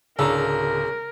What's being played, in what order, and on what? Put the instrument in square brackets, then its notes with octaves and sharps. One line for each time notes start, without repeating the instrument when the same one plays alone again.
[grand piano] D1 A#5 [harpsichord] C#3 [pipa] D4 A4 [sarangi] A#4